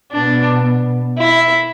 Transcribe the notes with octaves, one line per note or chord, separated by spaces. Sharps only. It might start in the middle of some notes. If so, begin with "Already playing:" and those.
B2 B3 D4
E4